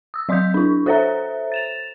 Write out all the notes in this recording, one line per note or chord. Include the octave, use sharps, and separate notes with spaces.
D#6 E6
F#3 D5 C6 D#6 G6 B6
D4 E4
F#4 A4 C5 C#5 E5 A#5
A6 E7 F7